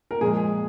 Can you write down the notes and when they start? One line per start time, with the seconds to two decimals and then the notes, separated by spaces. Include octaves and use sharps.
0.11 A#4
0.21 A#2 F3 G#3 G#4